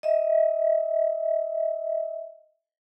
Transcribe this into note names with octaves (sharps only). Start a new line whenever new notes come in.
D#5 E5